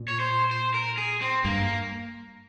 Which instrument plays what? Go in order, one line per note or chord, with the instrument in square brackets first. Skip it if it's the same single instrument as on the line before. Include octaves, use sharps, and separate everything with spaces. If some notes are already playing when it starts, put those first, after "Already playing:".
Already playing: [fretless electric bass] A#2
[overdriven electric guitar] C#5
C5
C5
A#4
G#4
C4
[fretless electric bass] G2 [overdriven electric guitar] A#3